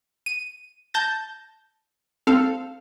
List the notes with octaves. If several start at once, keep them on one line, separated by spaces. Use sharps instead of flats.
D#7
A5 G6 A6 A#6
C4 A4 F5